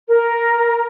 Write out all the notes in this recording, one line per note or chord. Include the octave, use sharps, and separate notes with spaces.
A#4